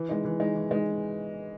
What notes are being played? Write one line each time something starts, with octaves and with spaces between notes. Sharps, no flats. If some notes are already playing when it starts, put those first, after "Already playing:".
Already playing: E3
G#3 D#4
E3
G#3 D#4
E3
G#3 D#4